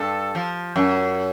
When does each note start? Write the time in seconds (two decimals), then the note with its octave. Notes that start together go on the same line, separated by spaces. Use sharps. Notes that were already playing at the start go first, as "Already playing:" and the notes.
Already playing: G2 A4
0.35 F3
0.76 F#2